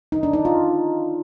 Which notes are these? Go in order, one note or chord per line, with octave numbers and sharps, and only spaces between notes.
D#4
D4
D#4
F4